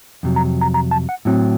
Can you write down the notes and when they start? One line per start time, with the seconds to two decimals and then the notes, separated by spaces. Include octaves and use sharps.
0.23 F2 C3 F#3
0.36 A#5
0.61 A#5
0.74 A#5
0.91 A5
1.09 F#5
1.25 A2 F#3 C4